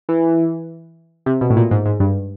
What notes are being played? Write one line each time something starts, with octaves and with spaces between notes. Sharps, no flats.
E3
C3
B2
A2
A#2
G#2
G#2
G2